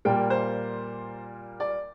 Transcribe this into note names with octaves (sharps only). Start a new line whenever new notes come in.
A#2 G3 A#3 G5
C5
D5